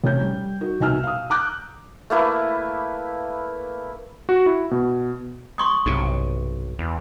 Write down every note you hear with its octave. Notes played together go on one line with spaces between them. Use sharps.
F1 C#4 G6
G3
D#4 F#4 A#4
C2 B2 D#4 G#5 E6 F6
F5 D#6
A#5 D6 F#6 G6
A3 A#3 E4 B4
F#4
E4
B2
C6 C#6 D#6
B1 G2 C3
E2